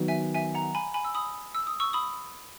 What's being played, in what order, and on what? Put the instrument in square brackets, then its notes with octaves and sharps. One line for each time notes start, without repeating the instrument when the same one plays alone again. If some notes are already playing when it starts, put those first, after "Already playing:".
Already playing: [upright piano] D#3 F#3 B3
[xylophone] E5 G#5
E5 G#5
F#5 A#5
G#5 B5
G#5 B5
E6
B5 D#6
E6
D#6
C#6 E6
B5 D#6